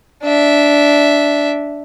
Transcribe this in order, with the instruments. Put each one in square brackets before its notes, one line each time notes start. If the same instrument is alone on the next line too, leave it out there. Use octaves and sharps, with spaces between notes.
[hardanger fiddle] D4 E5